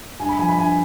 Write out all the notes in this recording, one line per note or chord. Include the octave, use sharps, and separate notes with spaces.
G2 G#5
B5
F3 G#5
B5
G2 G#5